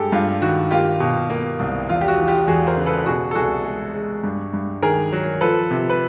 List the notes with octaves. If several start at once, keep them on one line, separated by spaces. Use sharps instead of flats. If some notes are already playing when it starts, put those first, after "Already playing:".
Already playing: G2 G#3 G4 A4
G2 F4
D#3 F#4
A#3 F4 G4
B2
A#3
C2
E2 F4
G4
F#4
E3
F4 G4
E2 F#4 G#4
A#4 C5
C#3
A4 B4
B2 F#4 G#4
A4
C2 F#4 G#4
G#3
G#3
G2
G2
D#3 G#4 A#4
F#3
F3 A4 B4
C3
B4